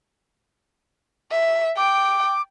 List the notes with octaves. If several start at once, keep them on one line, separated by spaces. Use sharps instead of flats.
E5
G5 D6